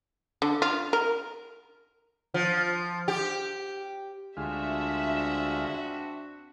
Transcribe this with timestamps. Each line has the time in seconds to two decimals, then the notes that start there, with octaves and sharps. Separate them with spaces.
0.42 D3
0.62 F4
0.93 A#4
2.34 F3
3.08 G4
4.37 D2 G#3 C4 D4 F4 F#4 E5